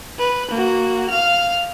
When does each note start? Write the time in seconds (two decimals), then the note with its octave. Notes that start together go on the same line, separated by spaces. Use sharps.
0.19 B4
0.51 A#3 F#4
1.09 F5 F6